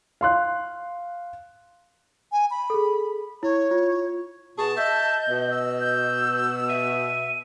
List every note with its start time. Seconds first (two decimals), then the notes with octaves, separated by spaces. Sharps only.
0.21 F5 C6 F#6
2.32 G#5
2.51 B5
2.70 G#4 A4
3.43 E4 C#5
3.71 F4
4.58 B2 B3 G#4 A5 C#6
4.77 D#5 E5 G6
5.29 B2
5.51 E6
5.81 G6
6.69 E5 D#7